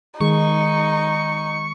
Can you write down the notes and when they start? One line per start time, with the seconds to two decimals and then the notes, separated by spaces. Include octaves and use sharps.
0.20 D#3 G#3 D#4 G#4 C#6